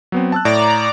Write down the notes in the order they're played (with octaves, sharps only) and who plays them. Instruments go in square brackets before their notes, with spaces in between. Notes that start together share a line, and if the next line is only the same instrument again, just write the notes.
[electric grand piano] F#3 B3 C4
A5 E6 F#6
[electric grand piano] A2 [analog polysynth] D5 A#5 D6